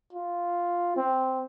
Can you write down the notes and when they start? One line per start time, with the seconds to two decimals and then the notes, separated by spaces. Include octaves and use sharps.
0.13 F4
0.96 C4